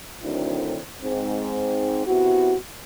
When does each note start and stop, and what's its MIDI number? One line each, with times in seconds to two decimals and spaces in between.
0.23 0.79 38
0.23 0.79 50
0.23 0.79 51
0.23 0.79 54
0.23 0.79 60
0.23 0.79 64
1.02 2.02 44
1.02 2.02 60
2.07 2.55 48
2.07 2.55 59
2.07 2.55 64
2.07 2.55 66